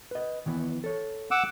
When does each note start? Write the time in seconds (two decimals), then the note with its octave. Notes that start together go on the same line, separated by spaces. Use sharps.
0.11 B4 D#5
0.46 D#3 E3 B3
0.84 A4 C#5
1.31 F#5 D6 E6